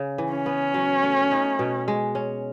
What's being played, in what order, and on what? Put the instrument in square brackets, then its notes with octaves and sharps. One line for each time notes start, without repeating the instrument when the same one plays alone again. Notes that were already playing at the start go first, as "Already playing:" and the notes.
Already playing: [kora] C#3
E3
[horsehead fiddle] C#4
[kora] B3
F#3
A3
D#4
B2
G#3
C#4